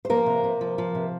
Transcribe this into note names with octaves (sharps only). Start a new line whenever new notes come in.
C5
F3 A#3 A#4
C3
C3
F3
F3
C3